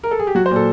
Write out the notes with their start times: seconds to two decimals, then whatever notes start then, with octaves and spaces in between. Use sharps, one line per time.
0.04 A#4
0.11 A4
0.19 G#4
0.27 G4
0.35 F#3 F#4
0.46 C5
0.51 A#2 A4